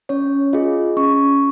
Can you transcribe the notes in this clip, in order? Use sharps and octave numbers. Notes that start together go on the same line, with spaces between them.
C#4 C#5
F4 G#4 D#5
C#4 C#6